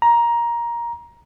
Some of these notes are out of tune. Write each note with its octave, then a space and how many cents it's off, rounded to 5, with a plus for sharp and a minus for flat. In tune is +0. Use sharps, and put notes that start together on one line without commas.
A#5 +15